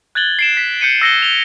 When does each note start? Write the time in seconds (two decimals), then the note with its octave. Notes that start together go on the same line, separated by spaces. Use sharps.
0.15 F#6 G#6 A6 F#7 G7
0.39 C7 D7 E7
0.57 B6
0.81 G6 C#7 D#7
1.02 E6 A#6 C#7 G7
1.22 F7 G7